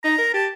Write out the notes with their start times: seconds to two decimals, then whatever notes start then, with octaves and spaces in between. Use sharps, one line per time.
0.04 D#4 A#5
0.18 A#4
0.34 G4 A5